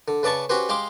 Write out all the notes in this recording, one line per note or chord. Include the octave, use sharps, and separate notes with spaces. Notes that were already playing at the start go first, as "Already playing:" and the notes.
D3
C#3 B4 D5 A5 C#6
C#4 F#4 G4 B4 C5
G#3 G4 F5 C6 D6